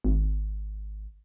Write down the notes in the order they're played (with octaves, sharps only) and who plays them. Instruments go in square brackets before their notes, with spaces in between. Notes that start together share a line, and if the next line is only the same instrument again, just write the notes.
[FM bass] G#1